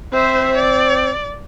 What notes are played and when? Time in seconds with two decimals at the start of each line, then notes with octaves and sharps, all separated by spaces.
0.13 C4 C5 E5
0.56 D5